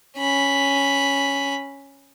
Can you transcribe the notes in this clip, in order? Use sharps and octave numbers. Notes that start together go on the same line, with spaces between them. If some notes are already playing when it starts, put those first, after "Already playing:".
C#4 B5